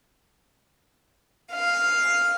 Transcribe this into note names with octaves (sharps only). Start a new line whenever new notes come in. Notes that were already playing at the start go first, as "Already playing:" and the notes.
F5